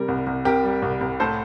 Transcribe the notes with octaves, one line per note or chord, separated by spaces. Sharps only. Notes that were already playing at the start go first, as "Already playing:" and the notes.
Already playing: C3 G3 A#4
C2
C2
C3 G4 A#4
G3
C2
C2
A2 A4 C5